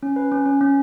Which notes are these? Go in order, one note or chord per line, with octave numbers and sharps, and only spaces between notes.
C#4
B4
C#4
C#4
C#4